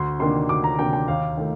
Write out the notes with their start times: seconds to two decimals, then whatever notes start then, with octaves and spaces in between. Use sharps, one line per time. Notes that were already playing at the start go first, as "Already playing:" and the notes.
Already playing: D2 C6
0.19 C3 D#3 A#3 D4 C6
0.49 D2 D6
0.64 A#5
0.78 C3 D#3 A#3 D4 G5
0.93 G5
1.08 D#2 F5
1.37 D#3 A3